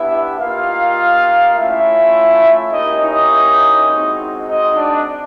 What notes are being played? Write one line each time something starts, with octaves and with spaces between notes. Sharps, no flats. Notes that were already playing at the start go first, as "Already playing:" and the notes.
Already playing: B3 D4 E4 G4 E5
A#3 D#4 F4 G4 F5
A3 C#4 E4 F4 E5
A#3 C#4 D#4 E4 G4 D#5
D#4 D#5
G#3 C4 D#4 F#4
D#4 D#5
D4 D5